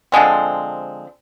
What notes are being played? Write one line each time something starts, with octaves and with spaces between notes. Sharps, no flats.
D3 F3 G#3 C4